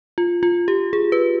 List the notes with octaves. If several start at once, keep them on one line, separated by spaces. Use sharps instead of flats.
F4
F4
G4
G#4
B4